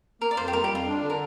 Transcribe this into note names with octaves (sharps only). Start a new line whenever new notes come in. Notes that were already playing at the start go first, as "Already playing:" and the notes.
A#3 A#4
D5
F2 C5
G4
G3 A#4
G4
F2
F4
D4
D3
A#4